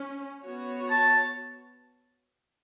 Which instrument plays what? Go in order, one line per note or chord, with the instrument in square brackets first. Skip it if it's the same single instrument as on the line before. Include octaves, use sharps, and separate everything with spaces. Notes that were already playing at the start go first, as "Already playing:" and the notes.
Already playing: [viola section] C#4
B3 F#4 C#5
[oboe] A5